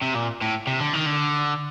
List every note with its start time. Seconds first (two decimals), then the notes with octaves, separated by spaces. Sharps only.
0.03 C3
0.15 A#2
0.42 A2
0.67 C3
0.80 D3
0.94 D#3
1.06 D3